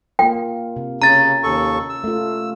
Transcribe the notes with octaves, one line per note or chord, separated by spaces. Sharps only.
A#3 F4 G5
C3
C#3 C#4 A#5 A6
D#2 A4 C#6
E6
A3 F4